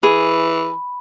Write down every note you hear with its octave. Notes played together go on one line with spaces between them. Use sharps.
E3 G#4 B5